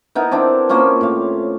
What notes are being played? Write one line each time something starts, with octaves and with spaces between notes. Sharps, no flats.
B3 D#4 E4 A#4
C4 D4 E4
A#3 C4 C#4 F4
A2 F5